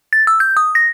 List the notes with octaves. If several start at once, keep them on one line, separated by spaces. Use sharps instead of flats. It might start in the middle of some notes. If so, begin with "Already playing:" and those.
A6
E6
G6
D#6
A#6